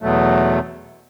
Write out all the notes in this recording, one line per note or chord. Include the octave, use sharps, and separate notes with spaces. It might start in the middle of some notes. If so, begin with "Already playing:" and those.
E2 B2 F#3 A3